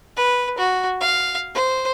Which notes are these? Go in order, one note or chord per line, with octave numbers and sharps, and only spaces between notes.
B4
F#4
F5
C5